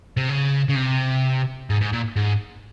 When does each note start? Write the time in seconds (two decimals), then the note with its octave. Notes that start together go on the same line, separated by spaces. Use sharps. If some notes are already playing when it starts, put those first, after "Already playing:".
0.17 C3
0.29 C#3
0.69 C#3
0.76 C3
1.70 G#2
1.81 G#2
1.92 A#2
2.16 G#2